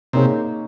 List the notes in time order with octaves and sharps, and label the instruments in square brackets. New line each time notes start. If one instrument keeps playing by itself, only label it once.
[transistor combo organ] C3 [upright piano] A#3 D#4 G#4 C#5